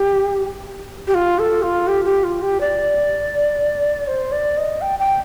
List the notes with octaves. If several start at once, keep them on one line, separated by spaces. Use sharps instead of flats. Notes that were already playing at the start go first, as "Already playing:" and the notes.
Already playing: G4
G4
F4
A4
F4
G4
G4
F4
G4
D5
C5
D5
D#5
G5
G5